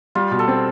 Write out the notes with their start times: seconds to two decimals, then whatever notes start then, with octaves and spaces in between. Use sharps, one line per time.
0.15 G3 F4
0.31 B2
0.39 A4
0.48 C4